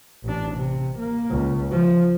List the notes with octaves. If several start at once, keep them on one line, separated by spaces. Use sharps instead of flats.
A1 D4
C3
A#3
C#2
F3